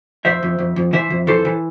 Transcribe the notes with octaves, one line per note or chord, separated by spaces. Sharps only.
F2 C5 E5
F2
F2
F2
E3 C5 E5
F2
E3 A4 C5
E3